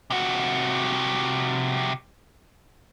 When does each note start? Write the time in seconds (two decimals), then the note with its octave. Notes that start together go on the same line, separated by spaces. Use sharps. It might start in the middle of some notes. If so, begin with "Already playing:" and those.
0.10 C3 F#4